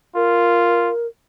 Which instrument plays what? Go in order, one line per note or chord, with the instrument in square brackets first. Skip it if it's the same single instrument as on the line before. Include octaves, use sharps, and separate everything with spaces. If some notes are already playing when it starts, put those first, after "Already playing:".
[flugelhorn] F4 [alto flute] A#4